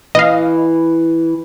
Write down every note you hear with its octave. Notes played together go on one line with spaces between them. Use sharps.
E3 D#5 F5